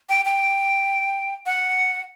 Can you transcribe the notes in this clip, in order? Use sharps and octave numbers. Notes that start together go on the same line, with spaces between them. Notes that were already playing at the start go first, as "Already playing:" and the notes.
G5
G5
F#5